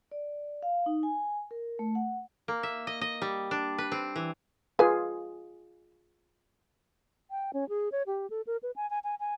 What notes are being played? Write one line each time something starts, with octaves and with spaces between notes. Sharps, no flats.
D5
F5
D#4
G#5
A#4
A3
F#5
A#3
E5
D#5
D#5
G3
D4
B4
C4
E3
F4 G#4 B4 G#5
G5
C#4
G#4
C#5
G4
A4
A#4
B4
G#5
G#5
G#5
G#5